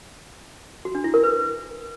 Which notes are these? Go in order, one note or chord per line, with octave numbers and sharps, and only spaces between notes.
F#4
D4
E4
A#4
B4